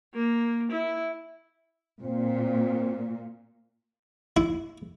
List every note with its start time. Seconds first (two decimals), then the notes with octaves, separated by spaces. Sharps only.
0.14 A#3
0.72 E4
2.04 A#2 C4
4.37 E4